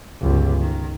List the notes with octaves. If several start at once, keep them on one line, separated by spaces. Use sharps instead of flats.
G1 C#2
D#3